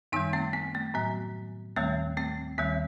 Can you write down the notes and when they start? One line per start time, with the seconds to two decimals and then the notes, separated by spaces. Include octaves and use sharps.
0.12 F#2 D#3 G3 B3 D#4
0.33 A3 C4
0.53 B3
0.75 A3
0.94 A2 F#3 B3
1.76 D#2 D#3 G3 A3 C4
2.17 A3 C4
2.58 D#2 D#3 G3 B3